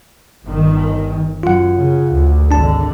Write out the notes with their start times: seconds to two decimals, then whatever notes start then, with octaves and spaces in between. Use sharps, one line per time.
0.44 G1 D#3
1.43 F#2 F4 F#5
1.76 C#3
2.11 D2
2.51 G#1 D3 D4 A5